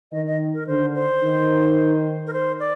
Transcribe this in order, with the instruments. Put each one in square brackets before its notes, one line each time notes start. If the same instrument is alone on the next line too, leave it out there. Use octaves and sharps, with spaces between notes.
[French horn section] D#3 [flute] D#5
[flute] D#5
A#4
[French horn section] D3 [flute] C5
[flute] C5
[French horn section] D#3
[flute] A#4
C5
D5